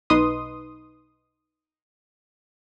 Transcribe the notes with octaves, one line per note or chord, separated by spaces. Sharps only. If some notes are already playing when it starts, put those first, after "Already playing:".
B1 D#4 B4 C6 D#6